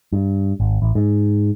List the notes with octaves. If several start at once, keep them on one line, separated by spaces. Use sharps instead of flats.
G2
G#1
A1
G#2